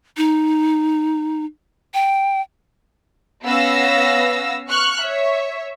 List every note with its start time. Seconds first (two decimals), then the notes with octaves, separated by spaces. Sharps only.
0.17 D#4
1.94 G5
3.44 B3 C#4 F5 E6 A#6
4.69 C#6 F6 F#6
5.00 C#5 E5